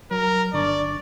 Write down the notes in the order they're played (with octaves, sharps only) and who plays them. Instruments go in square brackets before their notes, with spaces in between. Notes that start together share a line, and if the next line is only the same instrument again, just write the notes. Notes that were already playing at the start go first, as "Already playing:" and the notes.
[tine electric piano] F#3 [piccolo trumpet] A#4
[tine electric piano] G1 D4 C#6 [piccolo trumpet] D5